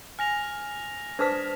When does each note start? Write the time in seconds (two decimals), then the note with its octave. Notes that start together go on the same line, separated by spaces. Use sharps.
0.19 G#5 F6 A#6 F7
1.19 D4 B4 C5 A5 D#6 B6